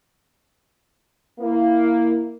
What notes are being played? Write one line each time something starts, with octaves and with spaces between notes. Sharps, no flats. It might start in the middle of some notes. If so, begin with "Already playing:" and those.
A#3 E4